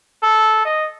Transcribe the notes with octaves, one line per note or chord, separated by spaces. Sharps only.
A4
D#5